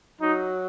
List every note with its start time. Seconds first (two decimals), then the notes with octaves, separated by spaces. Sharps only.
0.21 F#3 D#4